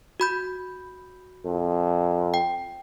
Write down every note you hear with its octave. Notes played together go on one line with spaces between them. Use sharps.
F#4 B5 G6
F2
G5